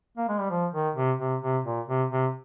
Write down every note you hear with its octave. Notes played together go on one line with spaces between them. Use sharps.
A#3
G#3
G3
F3
D#3
C3
C3
C3
A#2
C3
C3